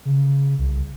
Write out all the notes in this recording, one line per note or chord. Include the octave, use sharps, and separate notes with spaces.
C#3
C2